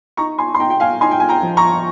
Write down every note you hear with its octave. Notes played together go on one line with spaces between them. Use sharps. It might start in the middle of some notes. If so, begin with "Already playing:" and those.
D#4 A#5 C#6
G#5 C6
C6
D#4 G5 A#5
G5
F5 G#5
D#4 G#5 C6
G5
G#5
G5 A#5
F3
A#5 C#6